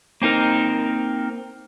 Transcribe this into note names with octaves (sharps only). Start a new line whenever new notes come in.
A#3 C4 D#4 A#4